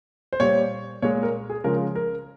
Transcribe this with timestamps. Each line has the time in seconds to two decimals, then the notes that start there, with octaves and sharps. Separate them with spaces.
0.33 C5
0.40 A#2 G3 C#5
1.02 A#2 G#3 C#5
1.23 A#4
1.49 G#4
1.64 C#3 F3 G#3 A#4
1.96 A#4